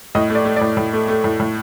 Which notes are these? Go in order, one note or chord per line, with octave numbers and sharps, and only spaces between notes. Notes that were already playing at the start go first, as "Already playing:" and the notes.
A2 D#5
A3
D5
A3
A2 D5
A2
A3
A3
A2
A2